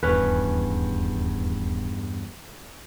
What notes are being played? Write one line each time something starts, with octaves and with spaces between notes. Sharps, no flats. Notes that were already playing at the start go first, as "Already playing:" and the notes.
D#1 E2 G2 C#4 B4